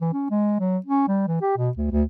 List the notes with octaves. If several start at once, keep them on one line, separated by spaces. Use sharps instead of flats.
E3
C#4
G#3
F#3
C#4
G3
E3
G4
B2
D2
D2